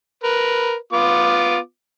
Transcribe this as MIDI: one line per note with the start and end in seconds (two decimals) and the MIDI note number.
0.24 0.74 70
0.24 0.74 71
0.93 1.57 59
0.93 1.57 65
0.93 1.57 86